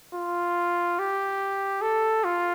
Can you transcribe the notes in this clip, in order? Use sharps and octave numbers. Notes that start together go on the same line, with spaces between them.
F4
G4
A4
F4